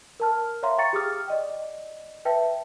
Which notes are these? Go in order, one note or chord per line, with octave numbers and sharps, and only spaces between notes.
A#4 A5 F6
C#5 E5 F5 A#5 C6
F5 G5 A#5 C#6 A6 C#7
G4 G#4 G5 D6 D#6 F6
D5 D#5 G5
B4 E5 G5 A5